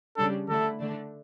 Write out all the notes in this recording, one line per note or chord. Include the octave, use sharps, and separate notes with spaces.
C#3 G3 D4 A4
D3 A3 E4 A4
D3 A3 D4